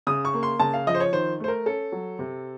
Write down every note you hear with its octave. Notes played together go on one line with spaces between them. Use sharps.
C#3 D#6
C#6
A#3
C6
C#3 A5
F5
F3 D#5
C5
C#5
D#3 C5
A3 C5
A#4
C#4 A4
F#3
C3